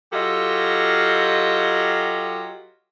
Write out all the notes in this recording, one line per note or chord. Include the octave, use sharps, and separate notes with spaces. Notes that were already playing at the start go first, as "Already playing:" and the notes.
F#3 F4 G4 A4 D#5